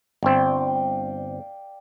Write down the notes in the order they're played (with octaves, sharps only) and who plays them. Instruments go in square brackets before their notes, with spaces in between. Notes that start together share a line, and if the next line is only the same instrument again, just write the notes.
[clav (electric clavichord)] G1 C4 [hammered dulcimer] D5 F5 G5